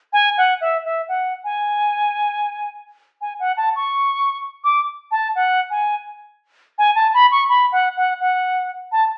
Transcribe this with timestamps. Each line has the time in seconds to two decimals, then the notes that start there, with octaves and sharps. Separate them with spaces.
0.13 G#5
0.38 F#5
0.61 E5
0.85 E5
1.08 F#5
1.44 G#5
3.21 G#5
3.40 F#5
3.57 A5
3.76 C#6
4.64 D6
5.11 A5
5.35 F#5
5.70 G#5
6.78 G#5
6.95 A5
7.14 B5
7.32 C#6
7.49 B5
7.72 F#5
7.97 F#5
8.21 F#5
8.92 A5